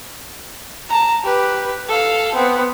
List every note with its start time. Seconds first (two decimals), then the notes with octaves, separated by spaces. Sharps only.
0.89 A5 A#5
1.23 G4 B4
1.88 A4 F5
2.34 B3 C4